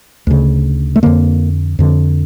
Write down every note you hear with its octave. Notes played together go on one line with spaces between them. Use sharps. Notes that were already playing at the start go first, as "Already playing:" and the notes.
D2 C#3
A3
F2 D3 A#3
F2 D3